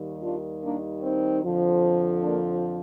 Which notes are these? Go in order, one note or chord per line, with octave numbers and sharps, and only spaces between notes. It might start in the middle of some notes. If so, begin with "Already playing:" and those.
Already playing: D#2 D#3 G3
D4 F4
A#3 D4
C4 D#4
F2 D3 F3
A#3 D4